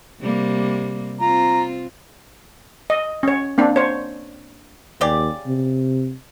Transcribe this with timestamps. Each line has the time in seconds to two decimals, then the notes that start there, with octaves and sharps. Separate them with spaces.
0.20 C3 G3 A#3
1.21 C4 F4 A#5
2.90 D#5
3.23 C#4 C#5
3.58 A#3 C4 D4
3.76 C5 C#5
5.01 D#2 C#3 G4 D5
5.47 C3